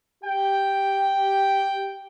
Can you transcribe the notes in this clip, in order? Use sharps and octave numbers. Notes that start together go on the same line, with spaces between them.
G4 G5